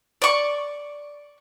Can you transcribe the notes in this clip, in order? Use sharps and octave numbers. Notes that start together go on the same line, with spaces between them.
D5 C#6